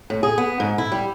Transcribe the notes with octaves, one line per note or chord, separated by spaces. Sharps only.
A2
G#4
B3
G#2
E4
G3